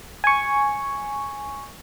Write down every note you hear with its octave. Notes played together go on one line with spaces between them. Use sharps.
G#5 C#6